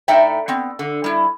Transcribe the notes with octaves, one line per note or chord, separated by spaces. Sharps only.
A2 D#4 A4 D5 E5 G5
B3 C4
D3
G3 E4